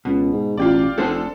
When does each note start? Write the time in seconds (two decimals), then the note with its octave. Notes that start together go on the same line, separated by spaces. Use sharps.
0.05 C#2 B2
0.32 G#2
0.57 A1 F4 G4 D5
0.98 F1 A3 D4 A4 C5